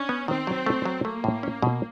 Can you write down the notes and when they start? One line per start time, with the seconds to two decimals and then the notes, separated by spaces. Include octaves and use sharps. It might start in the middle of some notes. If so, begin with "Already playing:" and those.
Already playing: C#4 D4
0.09 B3
0.27 D#3 C4
0.47 F#3
0.66 A3
0.85 F#3
1.04 A3 A#3
1.24 A2
1.43 C#4
1.62 B2